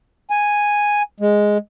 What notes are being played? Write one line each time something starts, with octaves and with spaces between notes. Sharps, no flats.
G#5
G#3